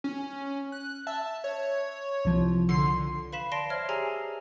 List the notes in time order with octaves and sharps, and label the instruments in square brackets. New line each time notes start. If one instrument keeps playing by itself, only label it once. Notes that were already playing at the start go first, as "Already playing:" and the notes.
[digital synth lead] C#4
F#6
[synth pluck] E5 [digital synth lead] A5
[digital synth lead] C#5
[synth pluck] C2 F3
[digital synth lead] D3 [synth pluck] C6 C7
[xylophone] B4 F5 B5 B6 E7
D5 A5 C6 A#6 C7 D7
C5 C#5 E5 F6 G#6 C7
G4 G#4 G#5 A#5 E6 C7